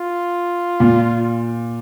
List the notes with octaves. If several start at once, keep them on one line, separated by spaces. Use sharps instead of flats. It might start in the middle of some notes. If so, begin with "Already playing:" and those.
Already playing: F4
A#2